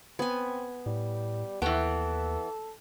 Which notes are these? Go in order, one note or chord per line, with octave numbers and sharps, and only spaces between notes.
B3 C4 G#5
A2 G3
D#2 E3 B3 A4 G5